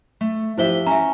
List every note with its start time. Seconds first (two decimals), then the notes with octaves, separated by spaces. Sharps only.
0.21 A3
0.58 F3 E4 G4 C5 E5 G7
0.87 C#4 E5 A#5